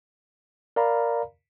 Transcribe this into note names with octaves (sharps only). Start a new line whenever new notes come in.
A#4 D5 F5 A#5 B5